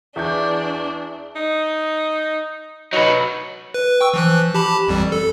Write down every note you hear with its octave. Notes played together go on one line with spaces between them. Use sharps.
E2 D4 G#4 E5 C#6 G6
D#4
F#3 D#4 B4
B4
G5 C#6 E6
E3 F3 F#6
G4 A5 B5
A1 F2 G3
A4